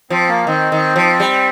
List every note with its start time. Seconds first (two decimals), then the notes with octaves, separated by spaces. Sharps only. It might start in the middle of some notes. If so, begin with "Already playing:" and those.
0.10 F3 C4
0.28 A#3
0.47 D#3 C4
0.72 D#3
0.96 F3
1.20 G3